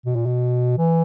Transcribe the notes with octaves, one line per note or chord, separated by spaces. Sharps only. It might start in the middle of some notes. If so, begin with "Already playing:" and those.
B2
A#2
B2
E3